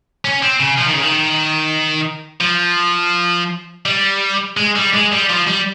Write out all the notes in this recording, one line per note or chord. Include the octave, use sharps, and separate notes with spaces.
C#4
C4
C#3
F3
D#3
C#3
D#3
F3
G3
G#3
G3
G#3
G3
F3
G3